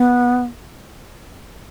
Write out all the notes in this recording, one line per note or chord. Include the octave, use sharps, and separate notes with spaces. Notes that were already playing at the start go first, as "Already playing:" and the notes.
Already playing: B3